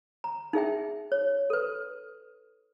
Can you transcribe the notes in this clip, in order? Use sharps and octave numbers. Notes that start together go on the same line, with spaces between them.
A#5
D#4 G#4 E5 G5
C#5
A4 B4